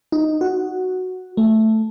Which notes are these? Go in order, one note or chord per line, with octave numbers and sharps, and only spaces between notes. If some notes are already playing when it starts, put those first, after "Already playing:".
D#4
F#4
A3